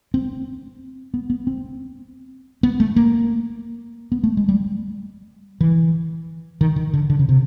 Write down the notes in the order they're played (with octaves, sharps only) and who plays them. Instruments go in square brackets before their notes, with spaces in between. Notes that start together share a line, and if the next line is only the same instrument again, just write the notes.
[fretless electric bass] C4
B3
B3
C4
B3
A3
A#3
B3
A3
G#3
G3
E3
D#3
D#3
D3
D3
C#3
C3